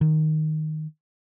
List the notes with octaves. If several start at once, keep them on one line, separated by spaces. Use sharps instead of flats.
D#3